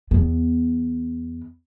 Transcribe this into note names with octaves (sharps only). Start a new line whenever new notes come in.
E2 B3